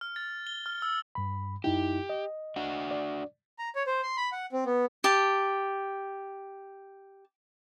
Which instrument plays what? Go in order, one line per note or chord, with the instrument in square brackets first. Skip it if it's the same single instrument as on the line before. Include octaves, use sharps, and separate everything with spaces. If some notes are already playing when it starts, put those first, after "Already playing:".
[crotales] F6
A6
G7
F6
E6
[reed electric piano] G2 B5
[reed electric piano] F#2 D#4 E4 [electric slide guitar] G4
[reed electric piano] D#5
[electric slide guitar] D4 F#4
[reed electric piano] D5
[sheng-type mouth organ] A#5
C#5
C5
C6
B5
F#5
C4
B3
[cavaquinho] G4 A5